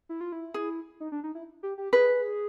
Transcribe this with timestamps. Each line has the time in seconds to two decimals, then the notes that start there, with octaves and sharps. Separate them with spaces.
0.09 E4
0.21 F4
0.32 E4
0.54 G#4
1.00 D#4
1.12 D4
1.24 D#4
1.35 E4
1.63 G4
1.78 G4
1.93 G#4 B4